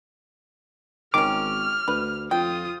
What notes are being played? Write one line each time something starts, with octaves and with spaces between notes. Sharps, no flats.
G#1 D#3 C#4 D6 F6
D2 B4
F2 F4 G5 D#6